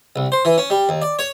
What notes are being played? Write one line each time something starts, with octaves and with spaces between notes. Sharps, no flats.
C2
C5
E3
C#4
G3
D#2
D5
C#5